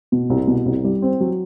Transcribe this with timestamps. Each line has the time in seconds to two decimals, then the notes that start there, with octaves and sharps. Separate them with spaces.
0.12 B2
0.30 C2
0.48 B2
0.66 C2
0.84 G3
1.02 C4
1.20 F#3